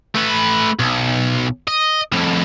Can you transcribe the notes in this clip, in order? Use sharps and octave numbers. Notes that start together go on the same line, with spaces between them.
A3 B4
B1
D#5
F2 A2